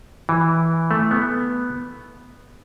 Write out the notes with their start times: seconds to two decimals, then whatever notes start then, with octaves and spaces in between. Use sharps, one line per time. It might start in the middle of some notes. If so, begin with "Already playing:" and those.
0.29 E3
0.91 A3
1.11 B3